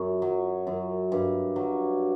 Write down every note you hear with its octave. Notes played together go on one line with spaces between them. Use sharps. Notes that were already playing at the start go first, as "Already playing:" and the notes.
Already playing: F#2
F#3
F#2
G2
F#3